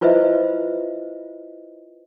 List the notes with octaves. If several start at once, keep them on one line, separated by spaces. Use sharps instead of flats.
E4 F4 B4 C5 D#5 E5